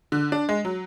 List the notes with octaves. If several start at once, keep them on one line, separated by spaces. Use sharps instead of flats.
D3
D4
G#3
F#3